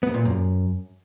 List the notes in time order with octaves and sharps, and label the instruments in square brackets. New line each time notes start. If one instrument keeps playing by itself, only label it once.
[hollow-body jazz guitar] B3
A#2
F#2